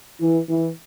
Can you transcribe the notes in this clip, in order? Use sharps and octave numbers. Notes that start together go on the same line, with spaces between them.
E3
E3